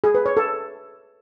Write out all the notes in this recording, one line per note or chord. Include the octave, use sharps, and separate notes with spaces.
G#4
B4
C#5
A4